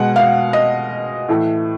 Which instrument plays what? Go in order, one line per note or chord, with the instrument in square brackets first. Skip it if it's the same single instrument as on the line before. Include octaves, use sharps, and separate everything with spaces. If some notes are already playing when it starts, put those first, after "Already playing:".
Already playing: [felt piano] B2 G#3 F#5
F5
D#5
A2 E3 A3